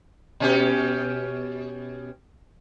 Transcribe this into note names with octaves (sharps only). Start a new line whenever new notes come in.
B2 C#4 G4